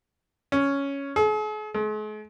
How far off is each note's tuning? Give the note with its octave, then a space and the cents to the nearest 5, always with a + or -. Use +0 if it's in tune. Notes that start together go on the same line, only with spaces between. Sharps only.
C#4 +5
G#4 +45
G#3 +45